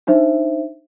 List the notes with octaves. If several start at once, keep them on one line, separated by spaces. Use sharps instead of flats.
D4 D#4 C5 E5